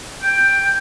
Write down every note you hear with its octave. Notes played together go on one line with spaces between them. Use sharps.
G5